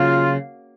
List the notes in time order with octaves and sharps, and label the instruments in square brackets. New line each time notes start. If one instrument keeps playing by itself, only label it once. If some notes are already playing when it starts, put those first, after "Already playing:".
Already playing: [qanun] C#3 F#3 A#3 [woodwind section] F4